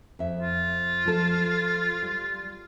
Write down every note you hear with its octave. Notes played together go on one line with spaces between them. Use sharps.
F2 E5
F4
F3 A4
G3